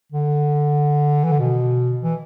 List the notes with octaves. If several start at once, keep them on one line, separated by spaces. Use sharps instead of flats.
D3
E3
D3
B2
E3